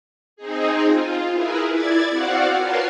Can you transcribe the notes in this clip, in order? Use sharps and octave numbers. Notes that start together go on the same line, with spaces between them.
C4 D#4 G#4
F4
E4 G#4 A#4 B4
E4 D5 G#6 A6
C4 F#4 D5 F5 F#5
F4 A#4 B4 C#5 A5 C6